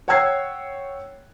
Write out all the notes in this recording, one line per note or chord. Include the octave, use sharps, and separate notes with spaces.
C#5 F#5 G5 E6 G#6 C7